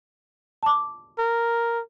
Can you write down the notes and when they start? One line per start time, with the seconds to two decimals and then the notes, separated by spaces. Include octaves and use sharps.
0.63 A5 D6
1.19 A#4